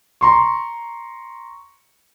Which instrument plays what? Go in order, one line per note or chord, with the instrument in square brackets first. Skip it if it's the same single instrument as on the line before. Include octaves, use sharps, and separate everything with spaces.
[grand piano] A#5 C6 C#6